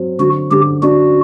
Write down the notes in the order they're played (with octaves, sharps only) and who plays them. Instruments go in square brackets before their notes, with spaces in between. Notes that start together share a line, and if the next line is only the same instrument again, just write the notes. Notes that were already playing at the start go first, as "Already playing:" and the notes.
Already playing: [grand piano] F#3 C4
[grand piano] D3 [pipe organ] F#4
[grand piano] D3 [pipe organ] G4
[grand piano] D4 [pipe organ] F#4